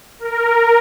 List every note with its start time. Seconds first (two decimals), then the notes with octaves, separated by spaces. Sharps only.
0.19 A#4